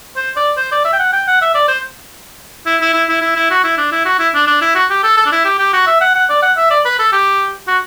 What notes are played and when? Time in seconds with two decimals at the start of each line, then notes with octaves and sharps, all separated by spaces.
0.16 C5
0.36 D5
0.57 C5
0.72 D5
0.85 E5
0.93 G5
0.99 F#5
1.12 G5
1.27 F#5
1.41 E5
1.54 D5
1.68 C5
2.66 E4
2.81 E4
2.94 E4
3.09 E4
3.22 E4
3.36 E4
3.51 F#4
3.64 E4
3.77 D4
3.92 E4
4.05 F#4
4.19 E4
4.34 D4
4.47 D4
4.61 E4
4.75 F#4
4.90 G4
5.03 A4
5.17 A4
5.26 D4
5.32 E4
5.45 G4
5.59 G4
5.73 F#4
5.87 E5
6.01 F#5
6.15 F#5
6.29 D5
6.42 F#5
6.57 E5
6.70 D5
6.85 B4
6.99 A4
7.12 G4
7.68 F#4